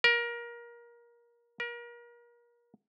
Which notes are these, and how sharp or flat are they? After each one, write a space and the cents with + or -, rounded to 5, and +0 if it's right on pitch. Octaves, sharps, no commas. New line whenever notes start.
A#4 +25
A#4 +35